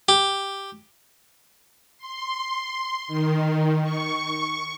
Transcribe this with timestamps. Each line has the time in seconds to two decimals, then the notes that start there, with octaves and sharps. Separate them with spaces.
0.09 G4
1.98 C6
3.08 D#3
3.82 C#6